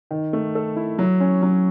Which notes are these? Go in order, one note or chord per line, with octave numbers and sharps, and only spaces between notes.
D#3
A3
A4
E4
F#3
C#4
F#3